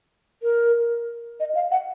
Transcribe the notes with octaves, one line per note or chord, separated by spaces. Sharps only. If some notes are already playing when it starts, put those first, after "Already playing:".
A#4
D#5
F5
F#5